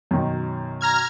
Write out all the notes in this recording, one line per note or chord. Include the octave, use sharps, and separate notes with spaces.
F#2 B2 D#3
A#5 F6 G#6